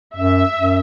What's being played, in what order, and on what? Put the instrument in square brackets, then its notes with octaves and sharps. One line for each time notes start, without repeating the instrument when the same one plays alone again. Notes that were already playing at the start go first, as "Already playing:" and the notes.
[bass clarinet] F#2 [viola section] E5
[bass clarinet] F#2